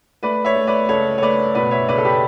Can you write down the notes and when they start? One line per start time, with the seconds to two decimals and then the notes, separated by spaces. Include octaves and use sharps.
0.23 A3 B4 D5
0.45 C#5 E5
0.55 A3
0.67 B4 D5
0.89 C#2 A4 C#5
1.18 C#5
1.22 A3 B4 D5
1.55 B2 B4 D5
1.71 C#5 E5
1.88 C#2 B4 D5
1.98 A4
2.04 G4 B4